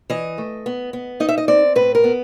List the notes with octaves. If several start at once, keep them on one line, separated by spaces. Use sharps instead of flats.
E3 D#5
A3
B3
B3
D#4 D#5
E5
D#5
C4 D5
A2 B4
A#4
B3